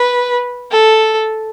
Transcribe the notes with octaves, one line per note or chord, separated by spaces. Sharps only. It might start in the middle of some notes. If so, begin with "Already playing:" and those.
Already playing: B4
A4